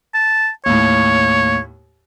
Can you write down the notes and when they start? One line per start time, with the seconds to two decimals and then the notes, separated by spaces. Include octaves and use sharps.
0.14 A5
0.66 D#2 A2 C#5